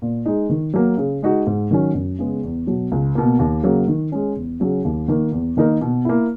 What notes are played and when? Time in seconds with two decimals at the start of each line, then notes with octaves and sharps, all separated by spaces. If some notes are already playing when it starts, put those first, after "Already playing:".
0.02 A#2
0.26 G#3 D#4
0.50 D#3
0.74 F#3 A#3
0.98 C#3
1.22 G#3 D#4 F#4
1.47 G#2
1.71 D#3 F#3 C#4
1.95 F#2
2.19 C#3 G#3 B3
2.43 E2
2.67 B2 F#3
2.92 C#2
3.15 B2 A#3
3.39 D#2
3.63 C#3 F#3 A#3
3.88 D#3
4.12 G#3 C#4
4.36 E2
4.60 C#3 F#3 C#4 G#4
4.85 D#2
5.08 D#3 A#3
5.32 E2
5.57 D#3 A#3 D#4 A#4
5.81 B2
6.05 A#3 E4